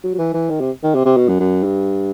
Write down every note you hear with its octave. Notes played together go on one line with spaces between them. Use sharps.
F#3
F#3
E3
E3
D#3
C3
D#3
C3
C3
B2
F#2
F#2
G2